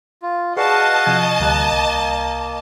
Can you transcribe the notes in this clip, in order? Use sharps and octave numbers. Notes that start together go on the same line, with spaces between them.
F4
F#4 G#4 B4 D5 D#5 F5 F#5 A5
C3 F3 G#6
D2 G3 A#3 F#6
C2